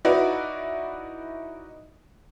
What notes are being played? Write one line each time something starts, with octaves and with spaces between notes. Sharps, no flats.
D#4 E4 F#4 B4 D5